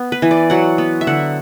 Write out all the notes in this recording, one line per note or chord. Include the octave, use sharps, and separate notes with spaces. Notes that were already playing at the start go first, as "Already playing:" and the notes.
Already playing: B3
B4
E3
D5
F#3 F#5
B3
E5
D3 F#5